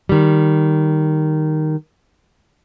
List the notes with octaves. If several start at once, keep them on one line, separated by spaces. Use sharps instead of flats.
D#3 G3